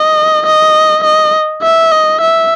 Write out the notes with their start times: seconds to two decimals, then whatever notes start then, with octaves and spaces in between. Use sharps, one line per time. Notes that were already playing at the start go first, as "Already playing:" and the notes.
Already playing: D#5
0.46 D#5
1.04 D#5
1.63 E5
1.92 D#5
2.21 E5